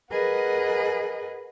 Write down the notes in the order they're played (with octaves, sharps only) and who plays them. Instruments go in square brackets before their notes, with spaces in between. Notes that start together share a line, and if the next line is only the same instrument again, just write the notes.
[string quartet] G#4 A#4 B4 D#5 F#5